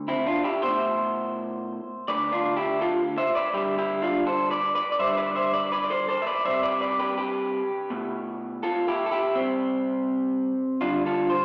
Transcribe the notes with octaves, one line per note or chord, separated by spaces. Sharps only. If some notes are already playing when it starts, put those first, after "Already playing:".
Already playing: D3 A3
C4 E4
D4 F4
E4 G4
B2 A3 C5 E5
D3 A3 B4 D5
D4 F4
E4 G4
F4 A4
C5 E5
B4 D5
D3 G3 E4 G4
E4 G4
D4 F4
A4 C5
B4 D5
B4 D5
D5
D3 G3 C5 E5
C5
B4 D5
C5 E5
B4 D5
B4 D5
D5
A4 C5
A4 C5
E5
B4 D5
C3 G3 C5 E5
B4 D5
B4 D5
G4 B4
G4 B4
B2 A3
F4 A4
E4 G4
A4
E4 G4
C3 G3 C4
D3 G3 D4 F4
F4 A4
C5